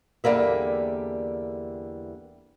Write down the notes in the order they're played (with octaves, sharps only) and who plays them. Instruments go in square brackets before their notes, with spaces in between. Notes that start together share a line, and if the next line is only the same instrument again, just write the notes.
[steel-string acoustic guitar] E2 D3 G3 A#3 E5